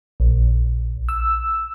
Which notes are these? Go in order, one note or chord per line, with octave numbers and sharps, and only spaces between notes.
A#1
E6